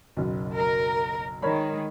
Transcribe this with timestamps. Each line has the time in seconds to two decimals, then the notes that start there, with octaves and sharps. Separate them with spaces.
0.17 F#1 B1
0.55 A#4
1.42 D#3 G#3 A#4 C#5 B5